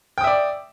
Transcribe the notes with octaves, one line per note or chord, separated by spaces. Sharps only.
D5 E5 G5 D#6